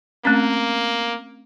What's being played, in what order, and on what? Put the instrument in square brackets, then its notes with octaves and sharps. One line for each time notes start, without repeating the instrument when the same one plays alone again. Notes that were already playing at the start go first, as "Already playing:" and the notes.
[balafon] A3 C4 C#4 [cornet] A#3